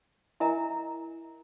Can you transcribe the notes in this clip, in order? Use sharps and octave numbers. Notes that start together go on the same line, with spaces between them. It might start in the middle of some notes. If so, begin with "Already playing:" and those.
E4 A#4 D#5 E5 G#5 A#5